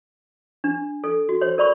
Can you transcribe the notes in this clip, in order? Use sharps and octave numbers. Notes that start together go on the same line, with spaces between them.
D4
A4
F#4
C5 C#5
A#4 D5 B5 C#6